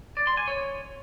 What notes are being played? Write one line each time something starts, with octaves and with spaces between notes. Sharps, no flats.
D5
C6
G#5
C#5